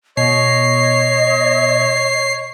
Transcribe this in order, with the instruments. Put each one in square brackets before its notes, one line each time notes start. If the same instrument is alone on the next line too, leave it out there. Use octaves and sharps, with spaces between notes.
[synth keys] B2 [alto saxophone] C#5 [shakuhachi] D#5 [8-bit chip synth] C7